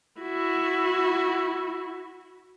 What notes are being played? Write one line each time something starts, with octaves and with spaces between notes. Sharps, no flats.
E4 F#4